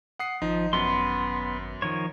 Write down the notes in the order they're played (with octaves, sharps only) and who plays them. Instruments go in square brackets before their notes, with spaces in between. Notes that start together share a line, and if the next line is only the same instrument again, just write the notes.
[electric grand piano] F#5 D#6 C7
[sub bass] G#1 [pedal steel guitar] F3 [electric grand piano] D#4
[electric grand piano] F#2 [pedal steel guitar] B3 C6
[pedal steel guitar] D#3 F3 C#5